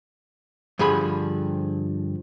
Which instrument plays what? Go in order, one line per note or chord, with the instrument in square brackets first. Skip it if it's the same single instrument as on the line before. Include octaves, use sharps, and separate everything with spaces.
[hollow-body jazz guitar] G2 D3 F3 G#4 B5